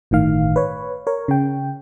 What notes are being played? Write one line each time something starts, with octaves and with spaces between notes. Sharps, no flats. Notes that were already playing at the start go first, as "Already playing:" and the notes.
G1 A2 D#3 F5
B4 C#5
A#4 C#5
C#3 G5